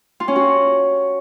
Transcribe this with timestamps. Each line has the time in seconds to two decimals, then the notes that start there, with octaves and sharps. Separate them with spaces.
0.20 F4
0.28 C#4
0.36 F#4